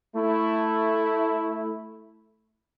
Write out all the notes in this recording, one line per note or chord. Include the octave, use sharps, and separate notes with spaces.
A3 E4